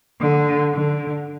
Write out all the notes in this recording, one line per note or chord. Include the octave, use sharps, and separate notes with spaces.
D3
D3